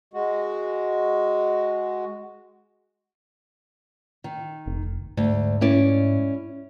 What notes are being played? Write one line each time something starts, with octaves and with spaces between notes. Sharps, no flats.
G#3 F#4
D#3
F1
D2 G#2
C#4 E4 D5